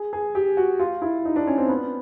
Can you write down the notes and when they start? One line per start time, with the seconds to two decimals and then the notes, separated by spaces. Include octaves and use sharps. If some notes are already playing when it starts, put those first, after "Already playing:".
Already playing: G#4
0.13 G#4
0.35 G4
0.57 F#4
0.79 F4
1.02 E4
1.25 D#4
1.36 D4
1.47 C#4
1.58 C4
1.69 B3